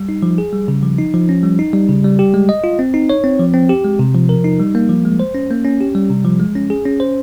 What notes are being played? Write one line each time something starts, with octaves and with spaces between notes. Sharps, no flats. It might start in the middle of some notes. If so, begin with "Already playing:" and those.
Already playing: G3
D#4
F3
G#4
G3
C#3
F3
D#4
F3
C#4
G3
D#4
G3
C#3
G3
G4
G#3
D#5
F4
C4
D#4
C#5
C4
F3
C4
G4
G#3
C3
F3
A#4
D#4
G3
A#3
F3
G#3
C5
C#4
A#3
C#4
G4
G3
C3
F3
G#3
C#4
G#4
C#4
C5